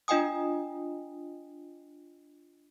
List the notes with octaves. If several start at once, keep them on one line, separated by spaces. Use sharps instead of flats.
D4 F4 D#5 G5 G#5 D#6